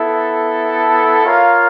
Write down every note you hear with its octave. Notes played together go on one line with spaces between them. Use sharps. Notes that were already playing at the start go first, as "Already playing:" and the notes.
Already playing: B3 E4 A4
F4 A#4 C#5 F5